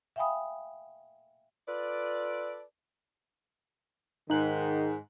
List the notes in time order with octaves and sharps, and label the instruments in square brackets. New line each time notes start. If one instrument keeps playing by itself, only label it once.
[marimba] E5 F5 G5 G#5 B5 D#6
[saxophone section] F4 A4 B4 D5
[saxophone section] G#2 [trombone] D#3 [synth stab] D#4 F#6